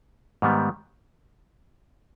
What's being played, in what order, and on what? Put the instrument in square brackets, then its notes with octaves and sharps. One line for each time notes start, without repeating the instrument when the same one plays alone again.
[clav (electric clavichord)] G#2 D#3 G3 B3